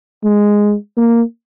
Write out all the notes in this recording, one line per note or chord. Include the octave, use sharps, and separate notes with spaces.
G#3
A#3